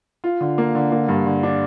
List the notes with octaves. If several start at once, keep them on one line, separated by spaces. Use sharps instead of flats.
F4
D3
A#3
D3
A#3
G2
D3
D4